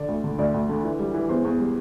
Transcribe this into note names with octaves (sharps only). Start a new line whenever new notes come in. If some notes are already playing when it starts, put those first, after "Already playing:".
Already playing: D3 D5
D2
D3
D2 D5
D2
D3
E3
G3
E3
E2 C5
E2
G3